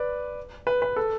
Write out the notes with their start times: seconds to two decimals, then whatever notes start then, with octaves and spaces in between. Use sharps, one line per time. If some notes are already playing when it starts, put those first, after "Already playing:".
Already playing: B4 D5
0.67 B4
0.82 B4
0.96 A4